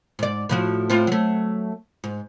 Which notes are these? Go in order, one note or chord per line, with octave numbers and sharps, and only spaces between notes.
G#2 D5
A2 F3 F#4
A2 C4 F4
F#3 A3
G#2